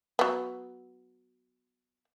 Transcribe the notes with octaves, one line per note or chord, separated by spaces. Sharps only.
F#3 B3